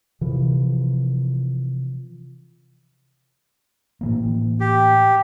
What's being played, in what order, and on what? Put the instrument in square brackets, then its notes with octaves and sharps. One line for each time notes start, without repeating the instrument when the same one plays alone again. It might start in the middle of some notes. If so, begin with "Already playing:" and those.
[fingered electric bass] C3 E3 F3
A2 E3 A#3
[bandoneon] G4